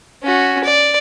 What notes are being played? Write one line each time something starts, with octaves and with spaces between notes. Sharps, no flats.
C#4 F#4
D5